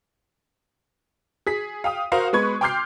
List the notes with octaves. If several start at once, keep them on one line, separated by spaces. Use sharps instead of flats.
G#4 B6
F5 G5 D#6
F#4 A#4 C5 F5
G#3 B3 B4 C#6 G#6
G5 C6 D6 F6 G6 C7